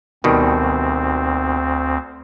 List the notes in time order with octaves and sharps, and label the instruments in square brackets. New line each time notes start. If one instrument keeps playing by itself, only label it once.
[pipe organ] D2 C4 [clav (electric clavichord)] B2 D#3 G3